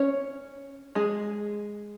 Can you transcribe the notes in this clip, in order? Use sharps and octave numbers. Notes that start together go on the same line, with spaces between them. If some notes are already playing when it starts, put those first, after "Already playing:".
Already playing: C#4 C#5
G#3 G#4